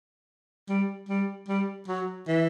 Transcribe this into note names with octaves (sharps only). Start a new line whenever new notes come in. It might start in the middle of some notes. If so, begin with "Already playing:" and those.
G3
G3
G3
F#3
E3